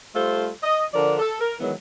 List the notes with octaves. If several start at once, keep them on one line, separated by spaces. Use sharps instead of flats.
G3 A3 F4 A4 C5
D#5
D3 F3 D4 A#4 D5
A4
A#4
D#3 E3 F#3 G#3 B3